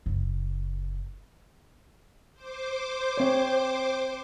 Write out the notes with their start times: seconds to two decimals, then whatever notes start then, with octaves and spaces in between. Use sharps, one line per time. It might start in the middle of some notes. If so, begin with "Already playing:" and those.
0.06 F#1
2.34 C5 D6
3.18 C4 C#5